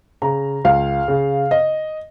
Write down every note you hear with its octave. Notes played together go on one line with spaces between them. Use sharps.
C#3 A#5
C#2 F5
C#3
D#5